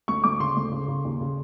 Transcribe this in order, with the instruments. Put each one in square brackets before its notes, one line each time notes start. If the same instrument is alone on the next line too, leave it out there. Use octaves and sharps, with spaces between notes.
[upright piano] D2 C#6
D2 D6
C#3 C6
D2
C#3
C#3
D#2
C#3